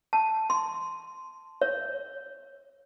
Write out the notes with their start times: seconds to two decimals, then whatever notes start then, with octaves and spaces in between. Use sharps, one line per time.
0.13 A5
0.50 C6
1.61 C#5